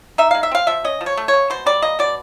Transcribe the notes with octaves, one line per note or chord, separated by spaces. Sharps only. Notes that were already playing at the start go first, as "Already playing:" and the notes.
D#4 E5
G#3 F5
E5
C4 F5
F3 E5
C#4 D#5
F3
C#5
A3
C#5
C#3
B2 C5
G3 D5
A#3 D#5
B2 D5